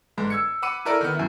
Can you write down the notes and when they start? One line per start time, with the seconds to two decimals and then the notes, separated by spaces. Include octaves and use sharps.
0.17 G1 G#2
0.30 E6 G#6 C#7
0.62 F#5 B5 D6 C#7 D#7
0.85 E4 A4 A#4 D5
1.01 D#3 B3
1.15 F#2 E4